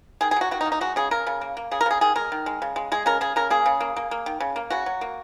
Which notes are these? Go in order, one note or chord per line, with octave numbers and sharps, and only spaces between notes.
D#3 G#4
G#4
F#3 F#4
D#3 F#4
D#4
A#3
D#4
G#3 F#4
C#3 G#4
C#3 A#4
C#3
A#3
A#3
C#3 G#4
A#4
C#3 G#4
D#3 G#4
G#3 A#4
D#3
G#3
C#3
G#3
G#3 G#4
C#3 A#4
C#3 G#4
C#3 A#4
A#3 G#4
C#3
A#3
A#3
A#3
D#3
C#3
A#3
C#3 F#4
F#3
A#3